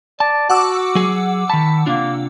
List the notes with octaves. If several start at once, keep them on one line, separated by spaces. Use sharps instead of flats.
D5 A5
F#4 F#5 D6 E6
F#3 G#4
D#3 A5 B5
C3 A#3 D4 F4